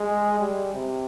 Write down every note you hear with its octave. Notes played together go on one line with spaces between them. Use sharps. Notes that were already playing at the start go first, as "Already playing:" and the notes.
Already playing: G#3
G3
C3